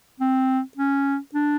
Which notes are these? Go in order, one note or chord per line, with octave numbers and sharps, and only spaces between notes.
C4
C#4
D4